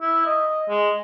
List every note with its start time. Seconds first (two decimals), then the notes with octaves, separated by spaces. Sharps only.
0.01 E4
0.26 D#5
0.69 G#3